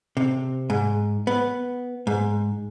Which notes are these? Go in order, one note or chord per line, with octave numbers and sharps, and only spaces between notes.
C3
G#2
B3
G#2